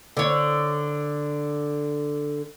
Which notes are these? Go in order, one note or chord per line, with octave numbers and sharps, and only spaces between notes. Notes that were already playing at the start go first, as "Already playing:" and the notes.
D3 C#5